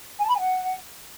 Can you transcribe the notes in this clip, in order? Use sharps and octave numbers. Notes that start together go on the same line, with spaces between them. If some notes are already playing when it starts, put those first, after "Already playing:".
G#5
A5
B5
G#5
F#5